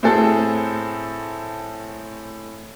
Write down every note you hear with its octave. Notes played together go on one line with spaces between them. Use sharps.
A2 C4 G#4 A4